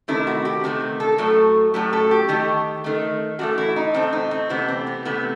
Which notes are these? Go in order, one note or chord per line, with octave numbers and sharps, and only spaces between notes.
C3 D#3 A3 E4
F#4
G4
C3 D#3 A3
A4
A2 F#3 A3
A2 F#3 A3 G4
A4
G4
D#3 A3 G4
D#3 A3
A2 E3 A3 F#4
E4
D#4
A2 E3 A3 C4
D#4
C4
C3 E3 A3 B3
C4
B3
C3 E3 A3 B3